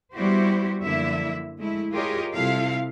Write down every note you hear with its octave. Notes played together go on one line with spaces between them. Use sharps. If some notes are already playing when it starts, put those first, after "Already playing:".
G3 B3 E4 F#4 G4 C5
F#2 D3 F3 A#3 E4 E5
G#3 A3 E4
F4 G4 G#4 A#4 C#5 D#5
C3 G3 E4 F4 A4 F5